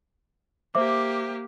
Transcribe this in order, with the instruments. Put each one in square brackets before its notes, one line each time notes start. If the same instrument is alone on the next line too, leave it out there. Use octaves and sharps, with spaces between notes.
[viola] A#3 G4 [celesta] C5 E5 D6